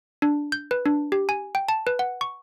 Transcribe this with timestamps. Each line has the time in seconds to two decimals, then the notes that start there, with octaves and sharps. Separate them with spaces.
0.22 D4
0.52 G6
0.71 B4
0.86 D4
1.12 G4
1.29 G#5
1.55 G5
1.69 A5
1.87 B4
1.99 F#5
2.21 C#6